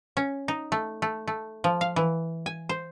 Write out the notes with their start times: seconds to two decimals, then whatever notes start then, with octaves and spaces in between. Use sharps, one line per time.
0.17 C#4
0.48 D#4
0.72 A3
1.02 A3
1.27 A3
1.64 F3
1.81 F5
1.96 E3
2.46 G#5
2.69 C5